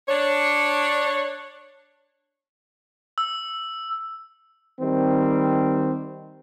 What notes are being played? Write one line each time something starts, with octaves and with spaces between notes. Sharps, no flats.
D4 C#5
E6
D#3 G3 C4